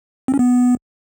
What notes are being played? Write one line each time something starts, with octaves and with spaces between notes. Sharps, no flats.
C4
C#4
B3